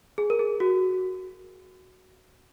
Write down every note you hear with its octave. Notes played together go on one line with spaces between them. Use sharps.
G#4
A#4
G#4
F#4